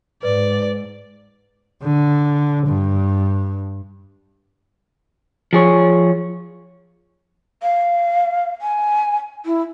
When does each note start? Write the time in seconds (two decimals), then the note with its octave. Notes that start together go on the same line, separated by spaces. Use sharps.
0.23 G#2 B4 D5
1.83 D3
2.67 G2
5.53 F3 G#4 C#5
7.63 F5
8.62 G#5
9.46 E4